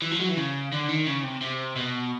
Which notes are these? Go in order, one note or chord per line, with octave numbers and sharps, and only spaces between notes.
E3
F3
F#3
E3
C#3
D3
D#3
C#3
C3
C3
B2